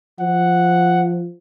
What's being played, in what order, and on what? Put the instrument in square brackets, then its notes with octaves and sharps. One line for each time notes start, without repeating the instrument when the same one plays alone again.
[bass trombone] F3 [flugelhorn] F#5